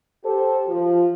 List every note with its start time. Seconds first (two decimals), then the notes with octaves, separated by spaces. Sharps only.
0.25 G4 A4 C5
0.69 F3